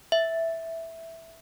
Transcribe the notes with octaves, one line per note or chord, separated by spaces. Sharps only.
E5